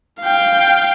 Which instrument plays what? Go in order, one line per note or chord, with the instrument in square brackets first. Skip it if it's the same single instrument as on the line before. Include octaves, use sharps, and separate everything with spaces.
[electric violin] F5 G5